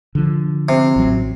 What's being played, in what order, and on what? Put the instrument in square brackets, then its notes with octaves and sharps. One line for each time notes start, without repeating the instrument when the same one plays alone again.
[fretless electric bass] D3 F3
[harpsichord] C3
[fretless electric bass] A1 F#3